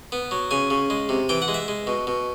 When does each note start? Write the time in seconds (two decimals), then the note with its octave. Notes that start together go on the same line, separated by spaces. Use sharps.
0.12 B3
0.31 F#3
0.51 C#3 G#5
0.70 C#3
0.90 G#3
1.09 C3
1.29 E3 G5
1.42 F#5
1.48 G#3
1.54 E5
1.68 G#3
1.87 B2
2.07 B2